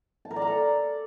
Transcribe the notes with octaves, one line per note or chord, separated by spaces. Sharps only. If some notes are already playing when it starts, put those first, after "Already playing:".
A5
A#4
D5
A#5
A4